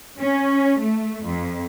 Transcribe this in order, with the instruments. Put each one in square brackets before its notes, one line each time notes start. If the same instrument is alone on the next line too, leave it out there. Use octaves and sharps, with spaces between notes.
[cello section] C#4
A3
F2